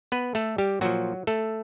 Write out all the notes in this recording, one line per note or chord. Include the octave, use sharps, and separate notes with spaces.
B3 B4
A3 A4
G3 G4
A#2 F3 F#3 F#4
A3 A4